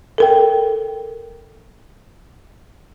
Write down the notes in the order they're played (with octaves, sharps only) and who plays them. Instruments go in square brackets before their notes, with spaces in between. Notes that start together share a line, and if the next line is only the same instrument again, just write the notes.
[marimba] A4 A#4 G5